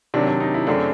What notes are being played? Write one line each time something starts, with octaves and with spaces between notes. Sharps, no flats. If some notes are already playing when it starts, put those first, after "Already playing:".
C3 D#3 F#3 D4
D4
D#4
E4
F#2 C#3 F#3 A3 C4 D4